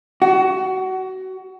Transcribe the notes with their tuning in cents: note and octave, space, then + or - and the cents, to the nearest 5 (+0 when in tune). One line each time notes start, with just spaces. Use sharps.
F#4 +25